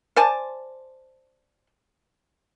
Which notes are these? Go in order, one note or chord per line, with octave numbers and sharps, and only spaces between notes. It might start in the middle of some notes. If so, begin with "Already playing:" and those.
C5 D5 G#5 A5